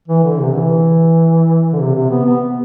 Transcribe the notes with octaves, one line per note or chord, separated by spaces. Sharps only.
E3
D3
C3
E3
D3
C3
C3
B3
B3